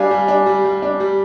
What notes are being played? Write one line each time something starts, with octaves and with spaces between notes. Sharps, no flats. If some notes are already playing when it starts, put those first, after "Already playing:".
Already playing: G3 D4 F5 G#5
G3
D4
G3
G3
D4
G3